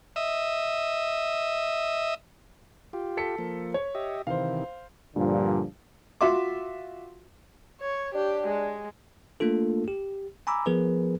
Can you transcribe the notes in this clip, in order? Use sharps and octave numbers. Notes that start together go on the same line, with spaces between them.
D#5 E5
F4 G4
A4 B6 C#7
F3 A#3
C#5
G4 D#5 E5
C3 D#3 E3 C5 F5
G2 A#2 D3 F3
F4 F#4 E5 C6 D6
C#5
D4 G4
G#3
A3 A#3 D4 F4 A4
G4
G#5 A#5 B5 D6 E6
F3 B3 G#4 A#4 B4